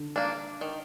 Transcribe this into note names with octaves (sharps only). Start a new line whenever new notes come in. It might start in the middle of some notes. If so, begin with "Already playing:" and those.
Already playing: D3
A#3 D4
D#3